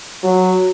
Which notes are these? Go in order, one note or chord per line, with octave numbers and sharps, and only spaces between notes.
F#3